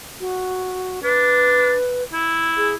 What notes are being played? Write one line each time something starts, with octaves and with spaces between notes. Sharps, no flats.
F#4
D4 B4
E4
G#4